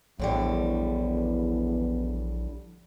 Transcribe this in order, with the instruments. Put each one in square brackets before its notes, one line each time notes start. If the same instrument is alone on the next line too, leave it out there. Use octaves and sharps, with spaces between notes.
[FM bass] A#1 [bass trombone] E2 [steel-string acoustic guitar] A2 D3 G3